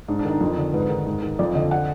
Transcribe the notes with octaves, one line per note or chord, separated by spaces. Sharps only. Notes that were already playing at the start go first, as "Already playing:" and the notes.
G#2 D4
D4
D#3
D#4
F2
D3
G#2 B4
D#3
G#2
D#3
F2 D5
D3 D#5
F#5